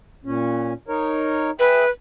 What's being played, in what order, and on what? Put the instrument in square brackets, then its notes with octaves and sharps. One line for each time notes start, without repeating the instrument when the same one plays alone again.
[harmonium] A#2 C#4
D#4 A#4 C#5
[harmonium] G#4 E5 G5 [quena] B4